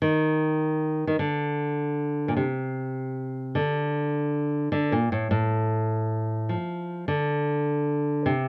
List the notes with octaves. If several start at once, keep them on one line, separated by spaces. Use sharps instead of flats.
D#3
D#3
D3
A#2
C3
D3
D3
A#2
A2
A2
F3
D3
C3